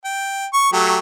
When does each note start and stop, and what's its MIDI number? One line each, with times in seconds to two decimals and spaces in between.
0.05 0.46 79
0.53 0.72 85
0.73 0.99 54
0.73 0.99 57
0.73 0.99 67